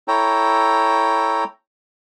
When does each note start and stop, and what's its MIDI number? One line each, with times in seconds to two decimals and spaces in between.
0.08 1.44 64
0.08 1.44 69
0.08 1.44 73
0.08 1.44 79
0.08 1.44 82